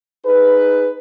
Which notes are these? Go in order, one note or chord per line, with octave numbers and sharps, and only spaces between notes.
D#4 G#4 B4